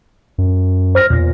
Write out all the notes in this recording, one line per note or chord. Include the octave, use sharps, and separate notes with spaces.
F#2
C5 F6 A#6
E2 A#2